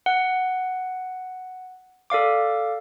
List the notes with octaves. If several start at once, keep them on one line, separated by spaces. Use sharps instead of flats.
F#5
A4 D5 F5 D6